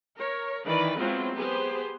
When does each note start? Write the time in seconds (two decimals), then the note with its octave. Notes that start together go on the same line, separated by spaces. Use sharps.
0.16 A#4 C#5
0.65 D#3 E3 B4 D5
0.99 F#3 G#3 B3 C4 E4 F4
1.34 B3 G4 G#4 C5